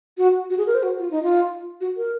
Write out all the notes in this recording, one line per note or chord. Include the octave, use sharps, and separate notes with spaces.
F#4
F#4
G#4
A#4
C5
F#4
F4
D#4
F4
F#4
A#4